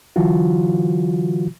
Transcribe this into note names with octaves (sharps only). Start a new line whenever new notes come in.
D3 E3 F#3 F4 F#4